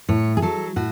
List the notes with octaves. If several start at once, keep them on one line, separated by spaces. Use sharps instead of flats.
A2 C#5
G#4
F#3 A4
A2 F#4